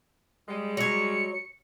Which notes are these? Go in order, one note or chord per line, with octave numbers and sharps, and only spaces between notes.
G3 G#3
F#3 C#5 C#7